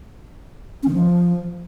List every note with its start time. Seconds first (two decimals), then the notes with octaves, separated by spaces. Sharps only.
0.83 C#4
0.88 D#3
0.93 F3